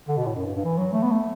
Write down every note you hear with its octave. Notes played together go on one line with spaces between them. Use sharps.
D3
B2
A2
F#2
G2
G2
E3
F#3
A3
B3
A3